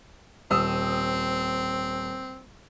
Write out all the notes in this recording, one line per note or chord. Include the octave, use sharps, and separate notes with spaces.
D#1 C4 D#6 E6